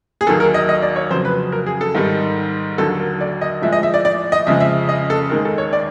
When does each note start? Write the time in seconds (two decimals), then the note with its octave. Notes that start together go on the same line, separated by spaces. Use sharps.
0.21 G#4
0.27 D#2 D#3 F#3 A4
0.40 A#4
0.54 D#5
0.69 D#5
0.82 D5
0.96 C#5
1.10 F2 C#3 F#3 C5
1.25 B4
1.52 A#4
1.66 G#4
1.81 A4
1.95 G#2 D#3 G3
2.78 D#2 D3 F#3 A4
3.00 A#4
3.21 D5
3.41 D#5
3.62 A2 F3 G#3 E5
3.73 D#5
3.83 E5
3.94 D5
4.05 D5
4.32 D#5
4.47 F2 C#3 F3 G#3 E5
4.60 E5
4.89 D#5
5.10 A4
5.30 D#2 D#3 G#3 A#4
5.45 A4
5.58 C#5
5.73 D5